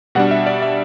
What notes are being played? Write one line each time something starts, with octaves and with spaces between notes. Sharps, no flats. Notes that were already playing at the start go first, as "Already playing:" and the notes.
B2 G3 D4 F#5
E5
D5
E5